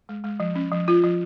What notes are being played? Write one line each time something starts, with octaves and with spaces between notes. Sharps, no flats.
G#3
G#3
F3
C#4
F3
F4
F3